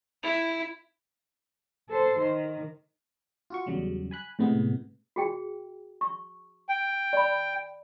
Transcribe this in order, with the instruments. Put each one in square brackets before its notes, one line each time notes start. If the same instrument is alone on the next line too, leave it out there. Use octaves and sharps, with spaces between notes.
[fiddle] E4
[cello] A4 C5
D#3
[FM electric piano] F4 F#4 C#6
E2 C#3 F#3 G3
G#5 B5 F#6
A2 C3 G#3 B3
[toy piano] F#4 G#4 G5
C#6
[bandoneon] G5
[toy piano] D5 B5